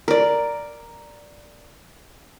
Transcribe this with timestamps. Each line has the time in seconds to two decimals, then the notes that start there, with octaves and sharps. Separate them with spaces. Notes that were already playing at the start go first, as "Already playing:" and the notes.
0.08 A#4 D5